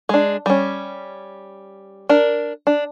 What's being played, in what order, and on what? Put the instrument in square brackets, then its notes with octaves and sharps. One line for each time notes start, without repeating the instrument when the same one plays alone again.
[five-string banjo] G#3 D4
G3 C#4
D4 A#4
D4